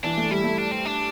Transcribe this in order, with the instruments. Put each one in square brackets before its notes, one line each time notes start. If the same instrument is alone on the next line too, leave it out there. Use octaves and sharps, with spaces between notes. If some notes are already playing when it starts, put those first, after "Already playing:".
[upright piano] E3 [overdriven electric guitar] D4
[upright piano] A3
[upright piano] G3 [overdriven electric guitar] E4
[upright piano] A3
[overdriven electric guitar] D4
C4
D4